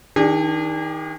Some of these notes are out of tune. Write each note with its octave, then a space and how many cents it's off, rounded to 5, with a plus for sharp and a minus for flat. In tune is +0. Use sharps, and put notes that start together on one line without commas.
D#3 +20 D4 +0 G#4 -40